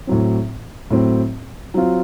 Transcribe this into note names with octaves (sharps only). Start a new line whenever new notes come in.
A2 F#3 C4
A2 F#3 C4
F#3 C4 F4